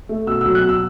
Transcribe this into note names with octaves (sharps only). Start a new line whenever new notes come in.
A3
B2 E6
F#3 E6
F#6
B2 E6